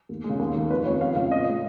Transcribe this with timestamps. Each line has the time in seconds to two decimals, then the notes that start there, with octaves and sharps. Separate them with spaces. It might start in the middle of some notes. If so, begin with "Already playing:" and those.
0.09 D#2
0.24 G#3
0.29 C#3
0.39 D#2
0.55 D#3 G#3
0.71 F2 B4
0.86 C#3 F3 G#3 C#5
1.01 F2 F5
1.16 C#3 F3 F5
1.31 A#2 D#5
1.46 G#3